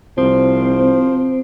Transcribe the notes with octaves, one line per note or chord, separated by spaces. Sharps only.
C2 F3 C4